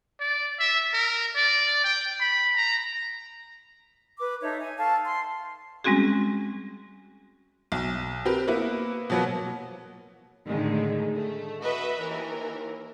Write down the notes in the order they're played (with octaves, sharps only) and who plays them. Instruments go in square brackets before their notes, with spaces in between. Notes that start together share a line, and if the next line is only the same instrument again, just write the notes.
[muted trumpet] D5
E5
A#4
D5
G5
B5
A#5
[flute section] B4 D6
D#4 A4 C#5 E5
G#5
A4 F5 A5 C#6
C6
[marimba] G3 G#3 C4 C#4 F#4 G#4
[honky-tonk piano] B1
C4 G4 A#4 B4
A#3 B3 E4 B4
B2 F3 F#3 A#3 B3
[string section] A2 D3 D#3 G#3
A3
F#4 B4 D#5 E5
D#2 E3 A#4